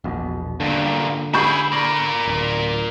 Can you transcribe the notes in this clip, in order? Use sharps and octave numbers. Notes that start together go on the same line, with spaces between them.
E1 A#1 B2
G2 A#2 D3
E4 G#4 B5 C#6 G6
A#4 D5
D1